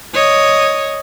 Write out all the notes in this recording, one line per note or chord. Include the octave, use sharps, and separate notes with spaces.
C#5 D#5